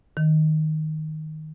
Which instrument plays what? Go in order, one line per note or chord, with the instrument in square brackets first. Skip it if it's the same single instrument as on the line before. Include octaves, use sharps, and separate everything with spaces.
[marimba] D#3